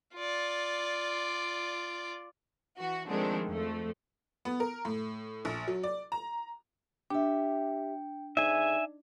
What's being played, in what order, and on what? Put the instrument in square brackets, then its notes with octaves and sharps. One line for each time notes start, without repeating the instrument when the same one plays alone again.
[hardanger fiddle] F4 D5
[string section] E3 F#4
D#3 F3 G#3 A3 C4 D4
F2 F3 A3
[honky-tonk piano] B3
A#4
A2
A#1
F#3
D5
A#5
[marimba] D4 [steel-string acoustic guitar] G4 E5 [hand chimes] G5
[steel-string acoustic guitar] F2 G#4 [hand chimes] D#4 D5 [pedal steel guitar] E5 G#5